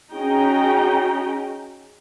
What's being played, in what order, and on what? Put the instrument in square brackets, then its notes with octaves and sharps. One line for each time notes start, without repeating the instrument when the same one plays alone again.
[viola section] C#4 D#4 F#4 G#4 G5 A#5